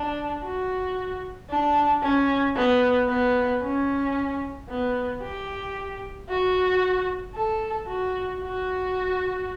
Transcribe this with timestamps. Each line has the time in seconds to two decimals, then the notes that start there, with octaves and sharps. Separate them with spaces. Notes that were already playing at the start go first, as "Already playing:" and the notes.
Already playing: D4
0.44 F#4
1.50 D4
2.03 C#4
2.56 B3
3.09 B3
3.63 C#4
4.69 B3
5.22 G4
6.29 F#4
7.35 A4
7.88 F#4
8.41 F#4